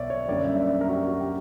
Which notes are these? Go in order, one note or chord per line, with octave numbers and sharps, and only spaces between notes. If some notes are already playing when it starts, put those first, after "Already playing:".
Already playing: B1 B2 C#5 D5 E5
C#5
F#2 D3 G3 A#3 D5
E5
E5
D5
A#4
F#4
G4
F#4
G4